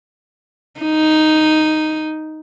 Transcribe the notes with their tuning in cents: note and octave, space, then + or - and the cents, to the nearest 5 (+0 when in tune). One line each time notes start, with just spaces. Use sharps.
D#4 +0